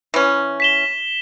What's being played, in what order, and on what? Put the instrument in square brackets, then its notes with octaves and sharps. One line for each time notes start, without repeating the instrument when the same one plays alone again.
[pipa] E3 C#4
[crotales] B6 E7 G7